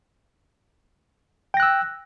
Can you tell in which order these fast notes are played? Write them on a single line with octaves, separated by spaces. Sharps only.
G5 A#6 F#6 E6